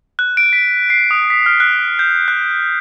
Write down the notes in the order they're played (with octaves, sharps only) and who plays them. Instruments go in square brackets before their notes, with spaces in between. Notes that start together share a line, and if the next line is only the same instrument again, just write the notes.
[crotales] F#6
D7
B6
C7
D#6
B6
F6
F#6
G6
F#6